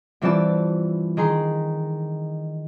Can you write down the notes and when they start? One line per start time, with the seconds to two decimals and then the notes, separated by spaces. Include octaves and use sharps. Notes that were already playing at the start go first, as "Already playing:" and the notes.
0.21 G2 E3 C4 F4 D5 A5
1.17 D#3 G#4 A#5 C6